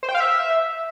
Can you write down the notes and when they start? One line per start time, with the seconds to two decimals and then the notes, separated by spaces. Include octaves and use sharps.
0.03 C5
0.09 G5
0.15 F5
0.20 E5